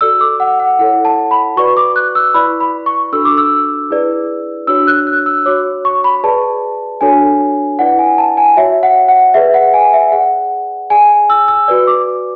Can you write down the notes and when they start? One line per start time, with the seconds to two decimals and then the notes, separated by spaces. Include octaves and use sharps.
0.01 F#4 A4 D5 E6
0.21 D6
0.40 F#5
0.60 F#5
0.79 E4 A4 C#5 F#5
1.05 A5
1.31 B5
1.56 F#4 B4 D5 C#6
1.77 D6
1.96 F#6
2.15 E6
2.34 E4 B4 D5 B5
2.60 B5
2.86 C#6
3.13 D4 F#4 A4 E6
3.25 D6
3.38 E6
3.90 E4 G#4 B4 D5
4.67 D4 F#4 C#5 E6
4.87 F#6
5.07 F#6
5.26 E6
5.46 F#4 C#5 D6
5.85 C#6
6.04 B5
6.24 G#4 B4 D5 A5
7.01 D4 F#4 A4 C#5 G#5
7.79 E4 B4 D5 F#5
7.99 G#5
8.18 A5
8.37 G#5
8.57 F#4 C#5 E5
8.83 F#5
9.08 F#5
9.34 G#4 B4 D5 E5
9.54 F#5
9.74 G#5
9.93 E5
10.12 G#4 D5 F#5
10.90 G#4 D5 G#5
11.30 E6
11.48 E6
11.68 F#4 B4 D5
11.87 D6